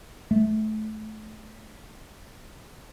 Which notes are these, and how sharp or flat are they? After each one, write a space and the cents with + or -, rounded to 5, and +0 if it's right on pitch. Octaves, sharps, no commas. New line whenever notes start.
A3 -25